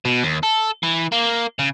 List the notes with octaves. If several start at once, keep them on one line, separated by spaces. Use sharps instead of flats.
B2
D#2
A4
E3
A#3
C#3